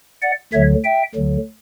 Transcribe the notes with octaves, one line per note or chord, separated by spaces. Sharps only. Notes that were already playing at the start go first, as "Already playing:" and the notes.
D5 F#5
D2 D3 F#3 C#5 E5
E5 G5
D2 D3 F#3